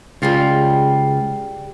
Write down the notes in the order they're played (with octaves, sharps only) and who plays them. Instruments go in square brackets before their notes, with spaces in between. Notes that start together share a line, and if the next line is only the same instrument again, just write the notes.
[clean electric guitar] C#2 F4 [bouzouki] G3 G#4 G5